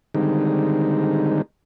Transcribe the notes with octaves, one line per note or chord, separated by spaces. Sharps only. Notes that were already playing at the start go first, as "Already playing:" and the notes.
D3 D#3 G3 G#3 C4 D#4